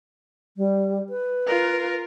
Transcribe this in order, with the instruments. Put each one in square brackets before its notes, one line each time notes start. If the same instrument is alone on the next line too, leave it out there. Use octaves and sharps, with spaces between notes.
[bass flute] G3
B4
[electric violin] F4 A#4